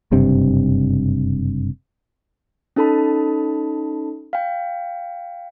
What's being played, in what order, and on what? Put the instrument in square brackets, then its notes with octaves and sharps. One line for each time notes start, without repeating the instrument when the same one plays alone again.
[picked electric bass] F#1 G2 C3
[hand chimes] C#4 D#4 A4 A5 B5
F5 G5